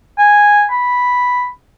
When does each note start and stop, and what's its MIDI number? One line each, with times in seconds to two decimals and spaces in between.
0.18 0.66 80
0.71 1.49 83